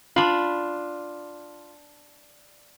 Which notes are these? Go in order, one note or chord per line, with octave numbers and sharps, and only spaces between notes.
D4 F4 B5